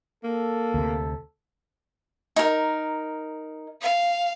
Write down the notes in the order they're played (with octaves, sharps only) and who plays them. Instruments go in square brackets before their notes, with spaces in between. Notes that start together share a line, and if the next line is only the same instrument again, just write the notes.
[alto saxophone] A#3 [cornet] A4
[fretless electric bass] D2 C3
[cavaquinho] D#4 A#4
[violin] F5